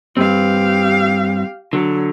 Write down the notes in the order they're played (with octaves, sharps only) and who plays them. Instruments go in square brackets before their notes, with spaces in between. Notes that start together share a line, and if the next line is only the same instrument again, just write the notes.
[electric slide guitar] G2 C4 [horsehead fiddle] G4 F5
[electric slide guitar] D3 [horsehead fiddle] F#3